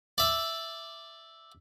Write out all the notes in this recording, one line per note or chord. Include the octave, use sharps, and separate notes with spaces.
D5 E5